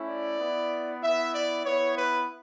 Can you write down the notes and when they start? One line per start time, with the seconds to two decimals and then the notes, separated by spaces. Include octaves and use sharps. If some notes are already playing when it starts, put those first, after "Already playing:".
Already playing: A3 C#4 E4
0.09 D5
0.39 B3 E4
1.02 B3 E4 E5
1.34 D5
1.65 B3 E4 C#5
1.97 B4